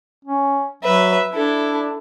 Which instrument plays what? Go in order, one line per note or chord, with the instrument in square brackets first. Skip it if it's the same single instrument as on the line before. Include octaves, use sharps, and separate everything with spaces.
[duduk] C#4
[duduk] F#3 [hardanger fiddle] B4 E5
[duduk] D4 [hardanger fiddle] E4 A4